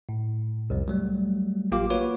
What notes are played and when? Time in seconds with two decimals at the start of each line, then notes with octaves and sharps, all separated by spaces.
0.09 A2
0.70 C2 F2
0.88 F#3 G3 A3
1.72 A1 A#3 F4 G4 F5 D6
1.90 A#3 F4 F#4 B4 C#5